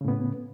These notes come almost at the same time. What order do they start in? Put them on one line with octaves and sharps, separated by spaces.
C#3 A2 B3